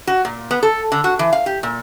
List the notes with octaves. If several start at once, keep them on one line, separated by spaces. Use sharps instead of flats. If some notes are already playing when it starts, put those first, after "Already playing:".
F#4
A#2
B3
A4
D3
F#4
E3
F5
G4
A#2